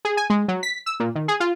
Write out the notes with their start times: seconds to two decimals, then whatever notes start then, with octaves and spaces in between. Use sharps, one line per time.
0.05 G#4
0.17 G#5
0.30 G#3
0.48 F#3
0.63 B6
0.86 E6
1.00 A#2
1.15 D#3
1.28 G#4
1.40 F4